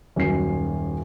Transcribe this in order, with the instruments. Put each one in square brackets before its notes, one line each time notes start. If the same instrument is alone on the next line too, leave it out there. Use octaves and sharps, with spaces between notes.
[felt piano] D#1 F#2 C#4 C7